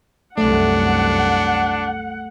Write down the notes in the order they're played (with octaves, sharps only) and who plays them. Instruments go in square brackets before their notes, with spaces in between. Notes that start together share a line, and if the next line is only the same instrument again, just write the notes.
[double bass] C2 F#2 [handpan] A3 [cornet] D4 [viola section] F#5